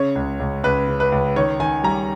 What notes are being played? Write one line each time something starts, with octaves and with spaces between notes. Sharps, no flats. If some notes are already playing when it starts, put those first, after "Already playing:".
Already playing: C#3 C#5
C#2
C#2
C#2 B4
C#3
B4
C#2
D#3 C#5
D#3 G#5
G3 A#5